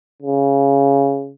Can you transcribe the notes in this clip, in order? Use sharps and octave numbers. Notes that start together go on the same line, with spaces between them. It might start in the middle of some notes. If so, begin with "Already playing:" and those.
C#3